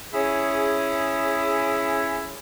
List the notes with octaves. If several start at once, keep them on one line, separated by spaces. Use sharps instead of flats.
C#4 E4 G#4